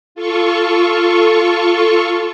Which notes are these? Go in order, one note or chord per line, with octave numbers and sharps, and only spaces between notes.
F4 A4 C#6